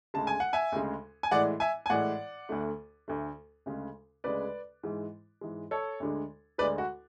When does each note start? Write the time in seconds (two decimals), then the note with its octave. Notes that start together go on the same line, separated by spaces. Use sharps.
0.14 D2 C#3 G#3 A5
0.27 G#5
0.40 F#5
0.53 E5 G#5
0.72 D2 C#3 G#3
1.23 G#5
1.31 A2 E3 G#3 D5 F#5
1.60 E5 G#5
1.86 G#5
1.90 A2 E3 G#3 D5 F#5
2.49 D2 D3 A3
3.08 D2 D3 A3
3.66 D2 C#3 G#3
4.24 D2 C#3 G#3 B4 D5
4.83 G#2 E3 G#3
5.41 G#2 E3 G#3
5.71 A4 C#5
6.00 D2 D3 G#3
6.58 D2 D3 G#3 B4 D5
6.78 F#4